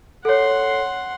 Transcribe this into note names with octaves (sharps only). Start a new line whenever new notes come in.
A4 C#5 F#5 C6